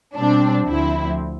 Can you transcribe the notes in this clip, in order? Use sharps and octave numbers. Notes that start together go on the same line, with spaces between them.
B2 G3 C4 D4
D2 D3 F3 C4 E4